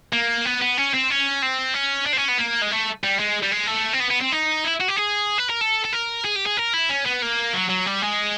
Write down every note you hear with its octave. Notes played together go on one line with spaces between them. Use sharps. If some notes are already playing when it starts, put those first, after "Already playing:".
A#3
B3
B3
C#4
C4
C#4
C4
C#4
D4
C4
C#4
B3
A#3
G#3
A3
G3
G#3
G3
G#3
A3
C4
B3
B3
C4
D#4
E4
F#4
G4
G#4
B4
A#4
A4
A4
A#4
G#4
G4
G#4
A#4
E4
C#4
B3
A#3
F#3
F#3
G3
G#3